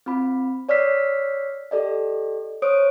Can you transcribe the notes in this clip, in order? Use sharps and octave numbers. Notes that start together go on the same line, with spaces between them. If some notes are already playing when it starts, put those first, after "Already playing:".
C4 F4 B5
C#5 D5 E6 F6 B6 C7
G4 A4 D5 D#5
C5 C#5 D#6 D7